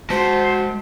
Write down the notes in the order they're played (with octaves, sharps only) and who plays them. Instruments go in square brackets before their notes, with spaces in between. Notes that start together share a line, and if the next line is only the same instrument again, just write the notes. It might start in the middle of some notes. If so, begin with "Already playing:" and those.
[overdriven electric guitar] G#3 A5 [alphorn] F#4 [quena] C5